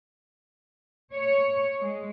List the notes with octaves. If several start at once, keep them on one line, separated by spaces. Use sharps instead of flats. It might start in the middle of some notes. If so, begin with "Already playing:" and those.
C#5
G#3